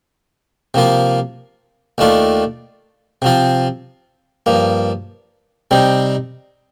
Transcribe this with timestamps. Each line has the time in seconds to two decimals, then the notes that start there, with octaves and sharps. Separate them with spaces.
0.74 C3 F3 A#3 F4
1.98 D#2 D#3 A3 D4 F4
3.22 C3 F3 C4 F4
4.46 G2 F3 A#3
5.71 C3 G3 C4 D#4